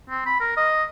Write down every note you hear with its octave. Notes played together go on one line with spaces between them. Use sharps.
C4
B5
A#4
D#5